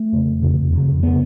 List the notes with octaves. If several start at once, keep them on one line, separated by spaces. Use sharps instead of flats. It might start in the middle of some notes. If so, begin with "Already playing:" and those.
Already playing: A3
F2 C#3
F2 C#3
F2 C#3
C#3 B3